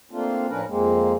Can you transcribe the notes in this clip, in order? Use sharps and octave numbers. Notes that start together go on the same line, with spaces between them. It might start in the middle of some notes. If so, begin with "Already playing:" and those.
A3 A#3 C4 D4 F4
A2 F3 C#4 D4 A#4 B4
F2 G#3 A#3 C4